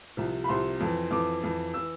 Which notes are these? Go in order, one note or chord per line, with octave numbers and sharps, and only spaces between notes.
C2 C3 F3
B5
C2 C3 F3 C6
F2 E3
F2 E3 D6
F2 E3
E3 E6